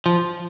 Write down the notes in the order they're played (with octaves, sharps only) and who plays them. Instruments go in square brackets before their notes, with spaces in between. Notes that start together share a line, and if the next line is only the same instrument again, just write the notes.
[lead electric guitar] F3